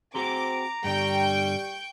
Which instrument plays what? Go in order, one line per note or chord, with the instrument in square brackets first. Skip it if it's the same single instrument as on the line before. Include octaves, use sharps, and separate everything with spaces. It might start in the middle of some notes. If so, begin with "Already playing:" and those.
[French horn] C4 [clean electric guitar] F#4 G#4 C5 [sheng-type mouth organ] A#5 [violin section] D6
[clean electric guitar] G2 D3 [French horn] G3 [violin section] G5 C#6 G6